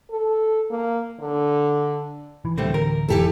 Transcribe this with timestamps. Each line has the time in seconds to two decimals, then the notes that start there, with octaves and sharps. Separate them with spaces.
0.10 A4
0.70 A#3
1.20 D3
2.45 E3
2.58 D1 D3 E3 G3 A3 C4
2.74 A#4
3.08 F1 E3 G4 A4